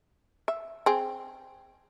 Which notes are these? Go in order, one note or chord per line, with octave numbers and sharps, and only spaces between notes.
E5
C4 G#4